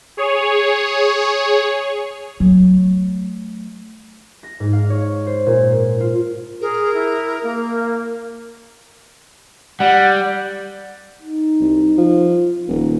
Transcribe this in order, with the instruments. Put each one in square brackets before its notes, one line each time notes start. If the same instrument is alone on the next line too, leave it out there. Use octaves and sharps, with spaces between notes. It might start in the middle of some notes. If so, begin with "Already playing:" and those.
[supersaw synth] G#4 C#5
[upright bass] F#3 A3
[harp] A#6
G#2
F5
C#5
C5
A#2
F4
[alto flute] G#4 [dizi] A#4
[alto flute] E4
A#3
[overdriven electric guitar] G3 [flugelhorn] F#5
[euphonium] D#4
[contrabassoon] C2
F3
[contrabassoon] D#1 [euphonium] A#3